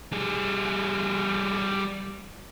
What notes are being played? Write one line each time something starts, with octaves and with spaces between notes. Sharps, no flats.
G3 G#4